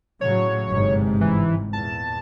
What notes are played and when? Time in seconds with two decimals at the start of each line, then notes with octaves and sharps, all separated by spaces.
0.21 A2 C#3 F#3 C#5
0.69 G1 G#2 C3
1.21 E3
1.73 E2 A#2 A5